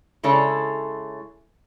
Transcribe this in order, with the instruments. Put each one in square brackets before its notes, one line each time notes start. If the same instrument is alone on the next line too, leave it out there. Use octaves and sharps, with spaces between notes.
[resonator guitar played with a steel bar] C#3 G#3 E4 A4 C#5